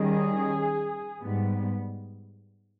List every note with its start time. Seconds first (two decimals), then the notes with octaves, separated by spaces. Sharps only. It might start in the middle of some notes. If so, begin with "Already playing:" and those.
Already playing: D#3 G3 C#4 G#4
1.21 G#2 G3 B3